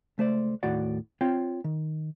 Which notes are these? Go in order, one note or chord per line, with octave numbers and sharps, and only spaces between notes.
C#2 A3 C5 D5
D#2 A2 F#4 D5 F#5
C4 F4 C#5 G5
D#3